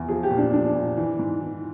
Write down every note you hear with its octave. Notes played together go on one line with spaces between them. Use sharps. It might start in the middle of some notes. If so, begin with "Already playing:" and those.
Already playing: E2
F3 G#4
G4
A#2
D4
F3 D4
A#2
E3
G#2
E3